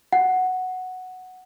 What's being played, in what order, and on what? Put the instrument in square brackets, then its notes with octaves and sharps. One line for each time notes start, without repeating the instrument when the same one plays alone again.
[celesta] F#5